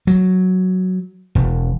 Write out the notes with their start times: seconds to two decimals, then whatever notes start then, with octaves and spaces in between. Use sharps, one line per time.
0.07 F#3
1.35 E1